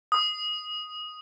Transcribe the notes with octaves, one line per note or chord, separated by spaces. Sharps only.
D#6